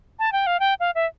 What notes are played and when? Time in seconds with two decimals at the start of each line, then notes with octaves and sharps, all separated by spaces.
0.19 A5
0.33 G5
0.47 F5
0.60 G5
0.80 F5
0.95 E5